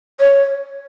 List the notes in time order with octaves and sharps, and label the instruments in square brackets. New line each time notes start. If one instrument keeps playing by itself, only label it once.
[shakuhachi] C#5